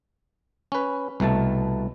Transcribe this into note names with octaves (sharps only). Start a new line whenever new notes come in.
C#4 B4
C2 B2 A3 A5